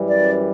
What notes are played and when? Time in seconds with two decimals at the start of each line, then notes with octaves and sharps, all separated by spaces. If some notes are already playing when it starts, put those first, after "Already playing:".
Already playing: F#2 E3 G3
0.09 D5